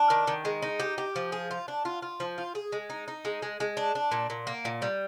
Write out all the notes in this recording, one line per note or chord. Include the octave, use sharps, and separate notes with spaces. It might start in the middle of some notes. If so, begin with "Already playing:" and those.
Already playing: D4
D#3
D#3
G#3
D#4
G4
G4
F3
G#4
F4
D4
F4
F4
F3
F4
G#4
G#3
D#4
D#4
G#3
G#3
G#3
D4
D4
A#2
A#2
A#3
A#2
G3